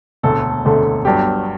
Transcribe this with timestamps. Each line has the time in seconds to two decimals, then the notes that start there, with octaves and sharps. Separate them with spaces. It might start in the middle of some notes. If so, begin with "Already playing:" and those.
0.23 E1 D2 D3 A3 A4
0.65 E1 D2 D3 A3
1.05 G1 G2 F#3 G4